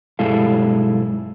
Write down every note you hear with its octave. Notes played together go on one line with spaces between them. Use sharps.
B1 G2 G#3 E4 A4 F5